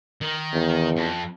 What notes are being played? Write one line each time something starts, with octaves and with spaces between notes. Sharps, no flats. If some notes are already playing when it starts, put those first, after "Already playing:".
D#3
E2
F2